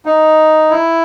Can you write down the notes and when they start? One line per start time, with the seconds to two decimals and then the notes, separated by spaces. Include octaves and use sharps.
0.05 D#4
0.70 E4